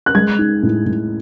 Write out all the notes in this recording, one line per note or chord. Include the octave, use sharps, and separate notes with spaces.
F#6
G#3 G#6
D#4
A2
A2